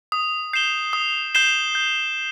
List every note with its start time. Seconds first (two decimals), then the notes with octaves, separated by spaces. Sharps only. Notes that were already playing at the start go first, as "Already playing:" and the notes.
0.12 D#6
0.53 G6 C7 E7 G7
0.93 D#6
1.35 G6 C7 E7 G7
1.75 G6